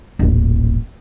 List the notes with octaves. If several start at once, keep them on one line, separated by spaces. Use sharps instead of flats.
D#1 A1